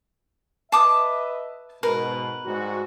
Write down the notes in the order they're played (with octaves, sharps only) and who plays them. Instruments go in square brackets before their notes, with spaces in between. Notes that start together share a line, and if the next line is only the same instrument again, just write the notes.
[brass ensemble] B4 D#5 E5 [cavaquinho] A5 D6 D#6
[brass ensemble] G#2 B2 [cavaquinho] A#4 B4
[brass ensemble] G#2 G3 F#4